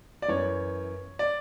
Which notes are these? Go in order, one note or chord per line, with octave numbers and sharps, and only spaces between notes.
D5
F#2 E3 B3 C#5
D5